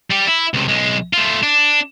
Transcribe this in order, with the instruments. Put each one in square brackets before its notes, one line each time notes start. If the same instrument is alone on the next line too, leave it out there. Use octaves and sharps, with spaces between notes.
[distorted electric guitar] G3 G4
E4
C#2 C3
B1 G#3
A3 F4
D4